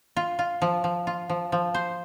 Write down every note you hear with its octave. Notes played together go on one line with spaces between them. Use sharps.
F4
F4
F3
F3
F4
F3
F3
C5